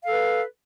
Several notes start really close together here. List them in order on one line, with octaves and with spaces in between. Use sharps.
F5 A4 B4